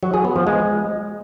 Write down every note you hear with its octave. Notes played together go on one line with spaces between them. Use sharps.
F#3
G#4
B3
F3
G#3